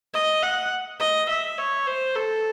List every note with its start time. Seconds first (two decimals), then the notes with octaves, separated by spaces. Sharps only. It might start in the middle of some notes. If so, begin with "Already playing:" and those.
0.14 D#5
0.43 F#5
1.00 D#5
1.29 E5
1.58 C#5
1.87 C5
2.16 A4